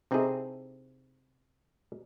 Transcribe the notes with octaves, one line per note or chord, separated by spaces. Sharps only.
C3 C4 D#4 E4 G#4 A4